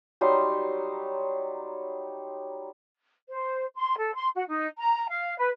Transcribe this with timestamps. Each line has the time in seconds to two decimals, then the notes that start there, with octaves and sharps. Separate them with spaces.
0.21 F#3 G3 D#4 C6
3.29 C5
3.74 C6
3.98 A4
4.15 C6
4.35 F#4
4.49 D#4
4.77 A#5
5.08 F5
5.38 B4